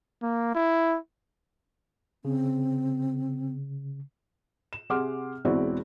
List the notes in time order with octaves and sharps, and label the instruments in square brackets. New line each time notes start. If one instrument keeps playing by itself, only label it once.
[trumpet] A#3
E4
[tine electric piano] C#3 [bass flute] C4
[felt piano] E7
C3 G#4 F#5 C6 D6 F6
E1 E2 C4 E4 F#4 D5